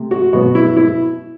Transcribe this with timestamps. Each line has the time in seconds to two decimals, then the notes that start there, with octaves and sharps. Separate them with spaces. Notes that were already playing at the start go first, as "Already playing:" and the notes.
Already playing: C3 A3
0.11 F#4
0.33 B2 F#3 B3 F#4
0.55 E4
0.77 E4